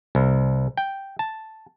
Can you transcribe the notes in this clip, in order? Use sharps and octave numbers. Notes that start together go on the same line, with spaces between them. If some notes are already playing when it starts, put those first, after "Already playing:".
C2
G5
A5